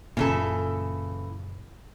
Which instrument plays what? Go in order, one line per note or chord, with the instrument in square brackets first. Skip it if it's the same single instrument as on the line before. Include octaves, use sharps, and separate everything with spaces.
[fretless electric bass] F#1 A#2 [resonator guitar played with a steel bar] C#3 E3 A4